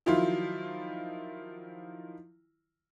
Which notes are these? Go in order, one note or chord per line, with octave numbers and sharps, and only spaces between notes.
D#3 F3 F#3 E4 F4